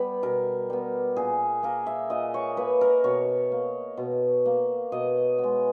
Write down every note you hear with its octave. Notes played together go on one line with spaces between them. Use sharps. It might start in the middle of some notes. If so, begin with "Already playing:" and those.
Already playing: G3 B3 B4
B2 A#4
G3 B3
A#2 G#4
A#3 A#4
E5
A#2 D#5
C#5
A#3 B4
A#4
B2 C#5
A#3
B2
A#3
B2 D#5
B3
G#3